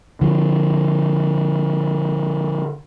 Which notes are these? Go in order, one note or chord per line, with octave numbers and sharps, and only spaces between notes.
D3 F3